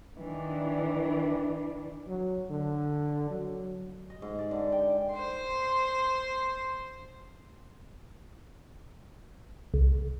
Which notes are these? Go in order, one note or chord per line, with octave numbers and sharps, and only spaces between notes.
D#3 E3 D4
F#3
D3
F#3
D#5
G#2
D5
D3
G5
C5 C6
C2